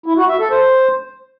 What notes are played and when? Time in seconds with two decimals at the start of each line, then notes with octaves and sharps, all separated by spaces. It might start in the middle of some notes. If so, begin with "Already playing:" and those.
0.06 E4
0.17 F#4
0.29 E5
0.40 A4
0.51 C5